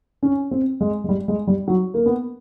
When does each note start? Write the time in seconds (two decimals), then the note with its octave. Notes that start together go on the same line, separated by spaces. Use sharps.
0.23 C#4
0.51 C4
0.81 G#3
1.04 G#3
1.09 G3
1.28 G#3
1.47 G3
1.68 F#3
1.94 A#3
2.06 B3